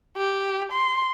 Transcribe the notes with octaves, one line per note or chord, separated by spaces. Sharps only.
G4
C6